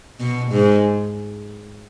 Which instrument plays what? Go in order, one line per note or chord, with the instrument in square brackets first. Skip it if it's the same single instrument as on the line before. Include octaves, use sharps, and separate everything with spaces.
[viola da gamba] B2
G#2